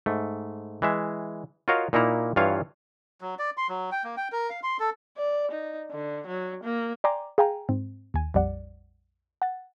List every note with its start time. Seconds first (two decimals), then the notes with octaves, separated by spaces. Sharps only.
0.06 G#2 A3
0.82 E3 G#3 E5
1.68 F4 F#4 A#4 C#5 D#5 F5
1.93 A#2 A#3 D#4 E4 A#5
2.36 G2 E3 F4 C#5 F5
3.21 F#3
3.39 D5
3.57 C6
3.69 F#3
3.92 G5
4.04 A#3
4.17 G5
4.32 A#4
4.50 F5
4.63 C6
4.80 A4
5.17 D5
5.51 D#4
5.91 D3
6.27 F#3
6.63 A#3
7.04 D5 G5 G#5 A#5 C6 D6
7.38 G#4 F5 G5 G#5 A#5
7.69 G#2 C4
8.14 D#2 G#5
8.34 A#1 F2 G3 D5 F#5
9.42 F#5 A6